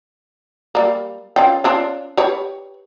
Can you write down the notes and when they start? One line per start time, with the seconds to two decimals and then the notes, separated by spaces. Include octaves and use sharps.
0.75 G3 A#3
1.36 C#4 F4 G5
1.64 C#4 D4 F4
2.17 G4 B4 C#5